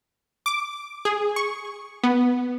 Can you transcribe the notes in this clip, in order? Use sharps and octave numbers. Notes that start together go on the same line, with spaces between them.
D6
G#4
C#6
B3